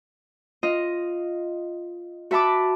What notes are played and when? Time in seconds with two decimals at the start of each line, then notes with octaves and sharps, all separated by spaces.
0.63 F4 D#5
2.31 F#4 E5 A5 B5 D6